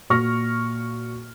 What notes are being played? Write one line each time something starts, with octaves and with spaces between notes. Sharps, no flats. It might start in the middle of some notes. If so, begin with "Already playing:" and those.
A#2 F#4 C#6 F6 A#6